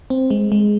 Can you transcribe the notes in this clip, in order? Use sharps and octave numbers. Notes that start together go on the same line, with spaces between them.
C4
G#3
G#3